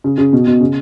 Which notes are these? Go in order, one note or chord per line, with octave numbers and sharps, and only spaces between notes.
C#3
C#3
B2
B2
C#3